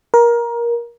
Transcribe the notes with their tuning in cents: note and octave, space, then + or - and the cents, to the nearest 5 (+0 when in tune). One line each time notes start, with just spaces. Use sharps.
A#4 +20